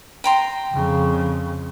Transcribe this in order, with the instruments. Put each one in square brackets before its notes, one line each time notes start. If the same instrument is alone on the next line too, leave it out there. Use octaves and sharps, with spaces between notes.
[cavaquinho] G5 A#5 C6
[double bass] F2 C#3